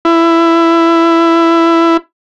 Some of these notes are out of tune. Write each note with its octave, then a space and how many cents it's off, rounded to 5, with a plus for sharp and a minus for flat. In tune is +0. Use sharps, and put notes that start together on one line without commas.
E4 +15